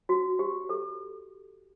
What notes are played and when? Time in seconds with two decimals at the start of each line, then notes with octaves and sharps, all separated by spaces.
0.09 F#4
0.39 G4
0.69 A4